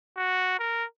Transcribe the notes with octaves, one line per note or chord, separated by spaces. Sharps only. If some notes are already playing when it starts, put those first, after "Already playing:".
F#4
A#4